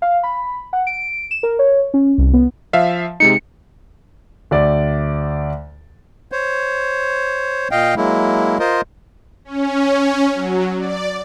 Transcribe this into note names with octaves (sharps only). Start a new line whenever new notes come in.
F5
B5
F#5
D7
E7
A#4
C#5
C#4
C2
B3
F3 E5 F5
C3 G#3 D#4 C#7
D2 D5
C5 C#5
A#2 D#5 F5 G5
F#3 G#3 A#3 E4
F4 A#4 C5 D#5
C#4
F#3
D5